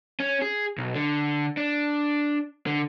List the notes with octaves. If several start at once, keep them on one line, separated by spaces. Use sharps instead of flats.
C#4
G#4
B1
D3
D4
D3